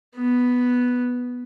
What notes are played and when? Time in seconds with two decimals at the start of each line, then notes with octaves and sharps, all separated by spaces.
0.16 B3